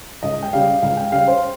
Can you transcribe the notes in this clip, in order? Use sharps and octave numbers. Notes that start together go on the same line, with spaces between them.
C#2 D#5
G5
C#3 G3 F5
C#2 F5
G5
C#3 G3 F5
C5